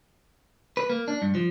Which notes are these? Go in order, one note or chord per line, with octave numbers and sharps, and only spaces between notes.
B4
A#3
D4
G2
F3